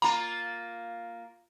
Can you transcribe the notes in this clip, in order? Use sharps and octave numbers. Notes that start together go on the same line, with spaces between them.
A#3 F4 A#5